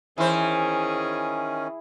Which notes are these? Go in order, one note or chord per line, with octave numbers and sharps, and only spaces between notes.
D#3 E3 C#4 E4 G#4 C5